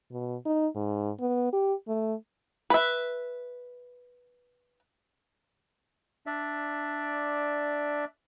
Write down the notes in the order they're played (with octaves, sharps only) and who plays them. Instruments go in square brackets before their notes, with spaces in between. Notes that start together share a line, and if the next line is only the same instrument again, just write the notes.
[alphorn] B2
D#4
G#2
B3
G4
A3
[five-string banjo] B4 E5
[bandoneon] D4 D5 E5